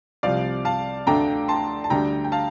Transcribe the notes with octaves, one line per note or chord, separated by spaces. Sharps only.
C2 C3 F3 D5 F5
F5 A5
D2 D3 A3 D4 A4 G5 A#5
A5 C6
A5
D2 D3 G3 D4 G5 A#5
G5
F5 A5